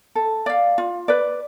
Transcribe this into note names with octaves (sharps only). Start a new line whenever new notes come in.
A4
D5 F5
F4
B4 D5